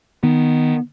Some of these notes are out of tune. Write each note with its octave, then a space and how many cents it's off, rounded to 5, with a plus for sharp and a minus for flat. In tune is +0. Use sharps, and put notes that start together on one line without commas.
D#3 +0 B3 +0